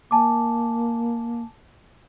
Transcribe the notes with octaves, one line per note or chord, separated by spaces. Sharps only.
A#3 G#5 A5 D6